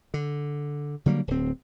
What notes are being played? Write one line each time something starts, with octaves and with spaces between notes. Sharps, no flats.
D3
D3 F#3 G3 A#3
D1 C4